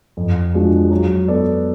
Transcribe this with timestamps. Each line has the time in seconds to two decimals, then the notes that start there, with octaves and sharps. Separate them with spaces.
0.17 F2
0.54 F3 G#3 D4 F#4
0.91 F#3
1.28 B3 F#4 A4 D5